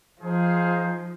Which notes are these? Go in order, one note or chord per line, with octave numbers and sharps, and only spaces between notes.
F3 D#4 G#4 C5 F5